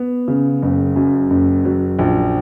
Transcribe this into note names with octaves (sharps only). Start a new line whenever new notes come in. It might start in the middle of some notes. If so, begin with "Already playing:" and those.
Already playing: B3
C#3
F#1
F#2
F#1
F#3
A#1